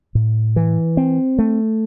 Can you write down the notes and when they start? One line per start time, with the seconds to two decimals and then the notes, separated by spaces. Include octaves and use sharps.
0.15 A2
0.56 E3
0.97 C4
1.39 A3